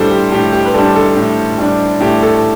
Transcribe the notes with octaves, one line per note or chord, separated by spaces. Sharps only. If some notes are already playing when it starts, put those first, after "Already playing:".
Already playing: A2 G3 D4 A4 C5
G4
A2 G4
G4
B4
G3 D4 A4
A4
A2
G3 D4
A2 G4
A4